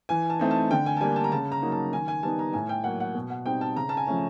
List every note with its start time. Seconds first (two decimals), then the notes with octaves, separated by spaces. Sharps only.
0.09 E3 G#5
0.30 A5
0.39 A3 C4 D#4
0.51 A5
0.71 D3 G5
0.86 G#5
0.97 A5
1.01 G3 A#3 G#5
1.16 A5
1.24 A#5
1.32 C#3 A5
1.52 A#5
1.62 F#3 A#3 D#4
1.72 A5
1.93 D#3 G#5
2.08 G#5
2.23 G3 B3 D#4 A5
2.39 A#5
2.53 A2 G#5
2.69 G5
2.84 F#3 A#3 F#5
3.00 F#5
3.14 B2
3.30 F#5
3.46 G3 C4 D#4 G5
3.61 A5
3.76 C#3 A#5
3.89 A5
3.97 G#5
4.07 F3 A3 C#4